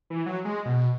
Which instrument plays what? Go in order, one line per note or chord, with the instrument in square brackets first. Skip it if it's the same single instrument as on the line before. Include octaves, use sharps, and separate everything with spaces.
[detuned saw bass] E3
F#3
G#3
B2